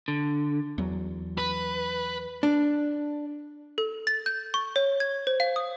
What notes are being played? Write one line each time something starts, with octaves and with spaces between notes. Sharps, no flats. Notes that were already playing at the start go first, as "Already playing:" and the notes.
D3
E2 F#3
B4
D4
A4
A6
G6
C#6
C#5
G#6
C5
F5
D#6